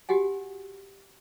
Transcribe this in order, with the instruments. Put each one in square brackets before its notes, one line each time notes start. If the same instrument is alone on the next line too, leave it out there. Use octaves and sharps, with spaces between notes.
[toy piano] F#4 G4 F#5 G#5